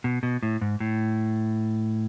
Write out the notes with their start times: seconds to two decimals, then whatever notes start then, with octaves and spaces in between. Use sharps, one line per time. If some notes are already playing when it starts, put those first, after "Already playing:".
0.04 B2
0.23 B2
0.43 A2
0.61 G#2
0.80 A2